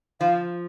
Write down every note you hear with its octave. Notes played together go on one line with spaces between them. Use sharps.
F3 F5